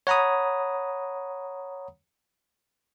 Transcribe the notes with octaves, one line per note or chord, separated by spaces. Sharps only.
C#5 F#5 A#5 B5 D#6